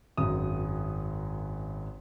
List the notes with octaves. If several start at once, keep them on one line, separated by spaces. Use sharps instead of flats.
G#1 F#2 D#6